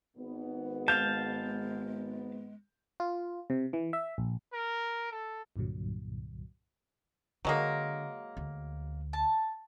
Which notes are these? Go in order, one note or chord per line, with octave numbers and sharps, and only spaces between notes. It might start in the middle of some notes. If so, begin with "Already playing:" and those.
G#1 G#2 B3
G#3 F5 A5 G6
F4
C3
E3
E5
A#1
A#4
A4
C2 G2 A#2 D3 F#3
D3 F#3 G#3 A#3
D2
A5